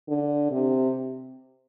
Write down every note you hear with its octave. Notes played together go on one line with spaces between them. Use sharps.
D3
C3